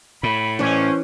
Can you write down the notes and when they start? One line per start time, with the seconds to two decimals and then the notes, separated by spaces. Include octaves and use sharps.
0.23 A2 B5
0.59 E3 C#4 D4 C5